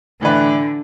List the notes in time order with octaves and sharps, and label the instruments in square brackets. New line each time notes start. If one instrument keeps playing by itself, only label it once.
[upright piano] A2 E3 D4 B4 [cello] D3